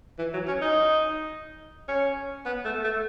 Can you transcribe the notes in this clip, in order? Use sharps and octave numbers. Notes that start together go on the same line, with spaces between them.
E3
F#3
C#4
D#4
C#4
B3
A3
A3